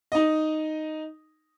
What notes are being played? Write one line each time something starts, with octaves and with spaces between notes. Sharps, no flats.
D#4 D#5